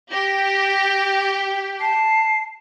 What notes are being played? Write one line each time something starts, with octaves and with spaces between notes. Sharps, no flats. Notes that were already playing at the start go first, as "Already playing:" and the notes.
G4 A#6
A5 C7